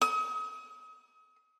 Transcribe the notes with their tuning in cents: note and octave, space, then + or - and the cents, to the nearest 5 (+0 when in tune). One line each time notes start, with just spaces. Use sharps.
D#6 +35